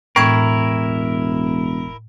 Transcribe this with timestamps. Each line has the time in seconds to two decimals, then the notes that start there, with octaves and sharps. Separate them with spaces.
0.16 E1 A2 E4 A#4 G5 C#6 G#6